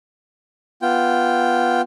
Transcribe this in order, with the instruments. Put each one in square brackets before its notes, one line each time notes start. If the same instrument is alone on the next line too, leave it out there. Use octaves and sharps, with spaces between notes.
[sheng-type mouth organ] B3 F4 G5